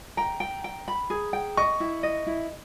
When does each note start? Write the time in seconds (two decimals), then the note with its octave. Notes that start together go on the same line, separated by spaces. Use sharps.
0.17 G5 A#5
0.40 G5
0.64 G5
0.88 B5
1.10 G#4
1.33 G5
1.57 D#5 C#6
1.80 E4
2.03 D#5
2.27 E4